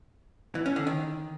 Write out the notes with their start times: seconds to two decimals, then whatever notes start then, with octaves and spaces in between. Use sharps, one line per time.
0.55 E3
0.66 C#4
0.76 D3
0.87 D#3